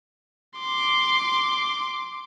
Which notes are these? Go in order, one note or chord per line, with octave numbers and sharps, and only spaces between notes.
C6 D6